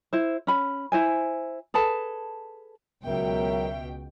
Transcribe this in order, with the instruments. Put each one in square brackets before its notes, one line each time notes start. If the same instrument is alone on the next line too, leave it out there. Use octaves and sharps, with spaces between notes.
[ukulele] E4 C5
C#4 B5
E4 C5 G#5
G#4 A4 B4 A5
[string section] C#2 B2 G5 [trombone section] F#3 A#4 [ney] E5